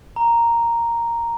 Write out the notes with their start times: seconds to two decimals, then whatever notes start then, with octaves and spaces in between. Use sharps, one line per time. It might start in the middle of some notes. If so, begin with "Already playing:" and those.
0.16 A#5